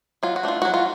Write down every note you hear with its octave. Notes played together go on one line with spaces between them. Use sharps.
F#3 F4
F#4
A3 D4 F4
F#3 F#4
F4